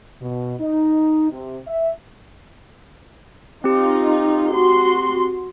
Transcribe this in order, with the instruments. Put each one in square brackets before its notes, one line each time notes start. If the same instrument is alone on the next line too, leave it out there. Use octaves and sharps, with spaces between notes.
[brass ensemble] B2
D#4
C3
E5
[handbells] C4 G4 [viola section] D#4 F4
[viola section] F#4 C6